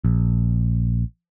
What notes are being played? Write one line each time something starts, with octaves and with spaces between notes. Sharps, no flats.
A#1